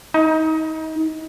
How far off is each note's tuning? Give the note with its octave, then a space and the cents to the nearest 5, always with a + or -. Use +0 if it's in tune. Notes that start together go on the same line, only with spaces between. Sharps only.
D#4 +30